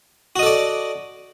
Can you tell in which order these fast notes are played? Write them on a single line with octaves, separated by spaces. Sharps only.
F#4 D#5 A4 D5